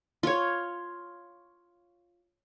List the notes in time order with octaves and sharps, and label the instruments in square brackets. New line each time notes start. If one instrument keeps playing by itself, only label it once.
[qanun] F4 C#5